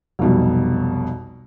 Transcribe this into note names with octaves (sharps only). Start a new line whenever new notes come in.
F1 B1 B2 G3